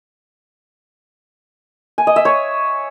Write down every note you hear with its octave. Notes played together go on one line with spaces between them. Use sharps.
G#5
D#5
E5
C#5